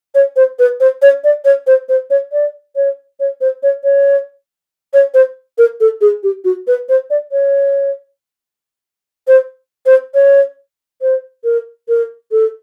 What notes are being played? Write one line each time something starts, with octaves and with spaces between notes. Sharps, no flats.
C#5
C5
B4
C5
C#5
D5
C#5
C5
C5
C#5
D5
C#5
C#5
C5
C#5
C#5
C#5
C5
A#4
A4
G#4
G4
F#4
B4
C5
D5
C#5
C5
C5
C#5
C5
A#4
A#4
A4